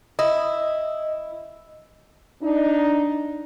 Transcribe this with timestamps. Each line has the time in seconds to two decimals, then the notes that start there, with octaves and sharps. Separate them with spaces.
0.19 E4 D#5
2.43 D4 D#4